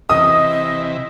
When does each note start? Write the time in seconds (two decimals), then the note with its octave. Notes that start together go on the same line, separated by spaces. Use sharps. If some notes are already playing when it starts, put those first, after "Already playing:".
0.09 C3 E3 D#5 D#6